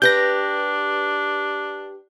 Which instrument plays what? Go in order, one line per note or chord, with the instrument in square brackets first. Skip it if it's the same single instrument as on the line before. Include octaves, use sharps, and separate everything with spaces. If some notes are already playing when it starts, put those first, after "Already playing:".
[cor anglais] D4 [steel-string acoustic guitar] G4 B4 [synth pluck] G6 A#6